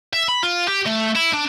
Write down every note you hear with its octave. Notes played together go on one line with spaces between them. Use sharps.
E5
B5
F4
G4
A3
E4
D4